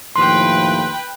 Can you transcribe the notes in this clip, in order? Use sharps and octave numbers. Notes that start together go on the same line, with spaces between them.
D#2 A2 F3 B4 G5 C6